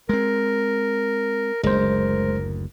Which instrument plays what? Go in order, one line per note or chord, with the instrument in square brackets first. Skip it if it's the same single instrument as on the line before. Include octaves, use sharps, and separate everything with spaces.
[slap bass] G#3 C4 [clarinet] A#4
[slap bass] F#1 D2 [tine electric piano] G#3 C5 [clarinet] A#4